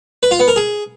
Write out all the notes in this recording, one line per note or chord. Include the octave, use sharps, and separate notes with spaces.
B4
F4
B3
A#4
G#4